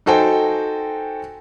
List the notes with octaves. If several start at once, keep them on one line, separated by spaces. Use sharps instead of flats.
D#4 F#4 A4 C5 G5 G#5